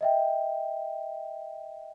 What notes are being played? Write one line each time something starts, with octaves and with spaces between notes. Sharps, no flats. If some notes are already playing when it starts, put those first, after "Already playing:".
D#5 E5 G5